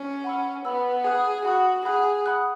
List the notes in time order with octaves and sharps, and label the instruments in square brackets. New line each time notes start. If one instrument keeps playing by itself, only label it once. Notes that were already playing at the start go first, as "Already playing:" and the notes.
Already playing: [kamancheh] C#4
[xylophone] F#5 B5 E6
[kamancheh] B3 [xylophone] F#5 B5 E6
[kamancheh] G#4 [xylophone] F#5 B5 D#6 F#6
[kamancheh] F#4 [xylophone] F#5 B5 D#6 F#6
[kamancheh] G#4 [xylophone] F#5 B5 D#6 F#6
[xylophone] F#5 B5 D#6 F#6